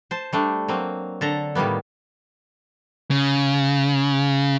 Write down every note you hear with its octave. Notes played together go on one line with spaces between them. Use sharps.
C5 A5
G3 A3 D4
F#3 A#3 C4
D3 A4 A5 A#5
A2 D#3 G3 A#3 B3
C#3